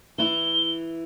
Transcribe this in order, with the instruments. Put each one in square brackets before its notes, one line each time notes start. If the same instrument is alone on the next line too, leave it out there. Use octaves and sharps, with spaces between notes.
[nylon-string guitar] E3 E4 [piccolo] G7